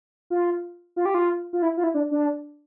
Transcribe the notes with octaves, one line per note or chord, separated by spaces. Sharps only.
F4
F4
G4
F4
F4
E4
F4
E4
D4
D4